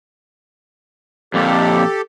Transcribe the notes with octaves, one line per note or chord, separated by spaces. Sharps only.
F2 A#2 G4 A4